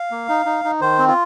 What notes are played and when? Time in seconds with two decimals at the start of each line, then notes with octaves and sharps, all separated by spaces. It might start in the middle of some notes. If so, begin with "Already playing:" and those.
Already playing: F5
0.11 A#3
0.29 D#4
0.46 D#4
0.64 D#4
0.81 D#3 C5
0.99 C4
1.08 F4